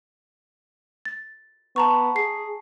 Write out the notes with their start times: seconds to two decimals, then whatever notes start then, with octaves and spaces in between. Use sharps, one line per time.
1.05 A6
1.76 B3 A5 A#5 C#6
2.16 G#4 C7